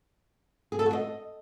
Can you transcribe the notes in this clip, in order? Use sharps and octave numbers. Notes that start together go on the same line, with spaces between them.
G#4
A4
F#4
D#5